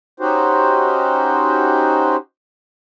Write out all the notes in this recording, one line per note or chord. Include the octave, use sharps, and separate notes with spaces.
C#4 D#4 F#4 G4 C5